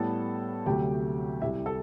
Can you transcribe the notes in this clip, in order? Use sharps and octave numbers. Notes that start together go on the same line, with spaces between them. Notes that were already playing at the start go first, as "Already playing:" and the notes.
Already playing: A2 G3 B3 A4 A5
D2 C3 F#3 A3 G4 G5
C2 C3 G3 E4 E5
A4 A5